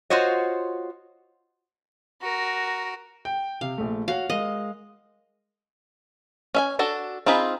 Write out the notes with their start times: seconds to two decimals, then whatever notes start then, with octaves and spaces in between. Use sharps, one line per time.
0.10 F4 F#4 C5 C#5 D#5
2.21 F#4 A#4
3.25 G5
3.61 C3 F5
3.78 A#1 A3
4.08 F#4 C#5 F5 F#5
4.30 G#3 A#4 D#5 F5
6.55 C#4 E5 G#5
6.79 D4 F#4 A4
7.26 C4 D#4 F4 G#4 B5